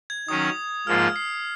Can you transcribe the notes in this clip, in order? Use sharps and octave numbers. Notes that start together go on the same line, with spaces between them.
G#6
D#3 F#3 C#4 D#6
G#2 F3 A#3 F4 F6
C7